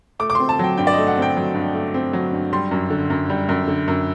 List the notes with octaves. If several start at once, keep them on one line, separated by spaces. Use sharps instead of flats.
A3 D6
D6
C4 C6
A5
F#3 G5
G2 G5
D5
A3 D#5
F#5
C4 G5
F#3
G2
A3
C4
F#3
G2
G3 C6
F#2
D3
F#2
G3
F#2
D3
F#2